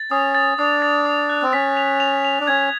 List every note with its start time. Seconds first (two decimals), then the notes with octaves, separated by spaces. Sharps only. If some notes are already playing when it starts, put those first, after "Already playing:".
Already playing: A6
0.11 C#4 D#6
0.35 A6
0.59 D4 D#6
0.82 A6
1.05 D#6
1.29 F#6
1.42 C4
1.53 C#4 B6
1.77 F7
2.00 F7
2.25 F7
2.40 D4
2.47 C#4 G#6